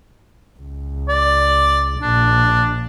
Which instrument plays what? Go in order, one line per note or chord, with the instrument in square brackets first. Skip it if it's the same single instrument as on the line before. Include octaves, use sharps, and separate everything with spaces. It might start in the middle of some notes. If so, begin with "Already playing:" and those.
[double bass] C#2
[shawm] D5
[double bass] A#1 [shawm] D4